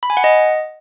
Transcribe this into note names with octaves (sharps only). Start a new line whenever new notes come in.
B5
G#5
F#5
D#5